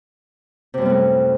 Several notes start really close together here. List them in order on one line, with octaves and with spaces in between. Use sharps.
C3 F#2 G3 B3 A2